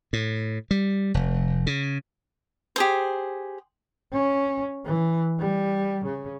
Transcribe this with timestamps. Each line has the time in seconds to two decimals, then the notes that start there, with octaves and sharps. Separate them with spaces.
0.13 A2
0.71 G3
1.14 F1
1.67 C#3
2.76 G4 G#4 C5
4.12 C#4
4.85 E3
5.39 G3
6.05 C#3